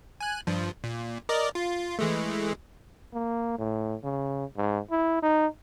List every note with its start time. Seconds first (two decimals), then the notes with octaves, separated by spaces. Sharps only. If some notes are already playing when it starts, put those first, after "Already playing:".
0.21 G#5 F#6
0.47 G2 F3
0.84 A#2
1.29 A#4 D5 D#5
1.55 F4
1.99 E3 G#3 A3
3.14 A#3
3.59 A2
4.04 C#3
4.57 G#2
4.91 E4
5.22 D#4